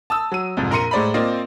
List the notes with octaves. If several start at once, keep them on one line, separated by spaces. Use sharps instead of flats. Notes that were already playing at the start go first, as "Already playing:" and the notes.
A5 D#6 E6
F#3 D#7
C2 F2 G#2
A#1 A#4 A#5 C6 C#7 D#7
A2 G#3 C5 D5 A#5 B5
A#3 C4 F4 C5 D5 D#5